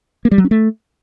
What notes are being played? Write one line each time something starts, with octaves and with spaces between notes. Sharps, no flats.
A#3
G3
F#3
C#4
A3